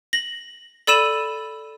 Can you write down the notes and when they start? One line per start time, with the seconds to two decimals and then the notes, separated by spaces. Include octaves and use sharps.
0.13 A#6 F#7
0.87 A4 D5 B5 E6 D#7 E7